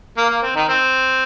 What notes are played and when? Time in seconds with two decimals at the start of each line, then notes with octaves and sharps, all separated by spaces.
0.17 A#3
0.29 A#3
0.43 C4
0.56 D#3 D#4
0.68 C4